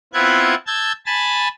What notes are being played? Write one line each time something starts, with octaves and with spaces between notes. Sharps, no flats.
B3 C4 E4 F4 F#6 G#6
A5 E6 G6 G#6
G#5 A5 B5 A6